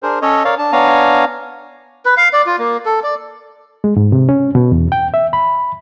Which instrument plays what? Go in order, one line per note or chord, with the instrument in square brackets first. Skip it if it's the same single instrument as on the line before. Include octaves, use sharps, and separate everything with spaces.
[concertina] D4 G#4 A#4 C5
C#4 A4 C#5 D#5
A#4 C#5 D5 F5
D4 A5
B3 D4 C#5 F5 G#5 A#5
[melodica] B4
F5
D5
F4
A#3
A4
D5
[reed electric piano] G#3
G#2
C3
C#4
B2
E2
G5
E5
B5